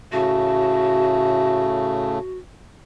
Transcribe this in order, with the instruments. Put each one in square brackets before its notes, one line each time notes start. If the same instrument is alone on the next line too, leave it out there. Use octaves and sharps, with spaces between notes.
[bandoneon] A2 C#3 A3 [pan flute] F#4